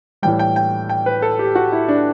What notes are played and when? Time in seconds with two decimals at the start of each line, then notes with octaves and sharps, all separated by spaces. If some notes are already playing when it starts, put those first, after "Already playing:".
0.22 A2 E3 G3 G5
0.39 G5
0.56 G5
0.89 G5
1.06 B4
1.22 A4
1.39 G4
1.55 F#4
1.72 E4
1.89 D4